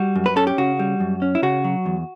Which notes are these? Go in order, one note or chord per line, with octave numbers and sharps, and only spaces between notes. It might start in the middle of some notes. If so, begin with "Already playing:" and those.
Already playing: G3 F#4
F#2
B4
C#4 A4
G4
C#3 F#4
G3
F#2
C#4
E4
C#3 F#4
F#3
E2